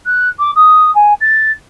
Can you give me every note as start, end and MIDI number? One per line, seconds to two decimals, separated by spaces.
0.06 0.29 90
0.39 0.51 86
0.56 0.93 87
0.95 1.13 80
1.21 1.52 93